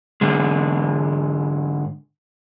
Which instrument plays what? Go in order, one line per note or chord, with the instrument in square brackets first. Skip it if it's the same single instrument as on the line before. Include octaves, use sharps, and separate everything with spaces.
[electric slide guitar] G#2 D3 G#3